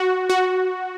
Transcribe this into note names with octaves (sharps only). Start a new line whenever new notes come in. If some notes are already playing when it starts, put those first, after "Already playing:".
Already playing: F#4
F#4